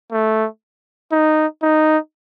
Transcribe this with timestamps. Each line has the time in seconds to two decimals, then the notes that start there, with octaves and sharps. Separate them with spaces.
0.12 A3
1.11 D#4
1.63 D#4